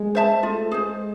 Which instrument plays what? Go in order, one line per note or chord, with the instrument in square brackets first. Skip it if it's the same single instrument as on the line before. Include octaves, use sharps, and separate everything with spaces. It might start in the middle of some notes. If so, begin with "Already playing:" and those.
Already playing: [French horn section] G#3
[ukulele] C5 E5 A5
[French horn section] A3 [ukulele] F4
[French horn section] G#3 [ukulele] G#4 C5